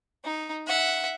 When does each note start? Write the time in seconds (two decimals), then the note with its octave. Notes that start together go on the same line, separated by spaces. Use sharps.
0.24 D#4
0.67 E5 F#5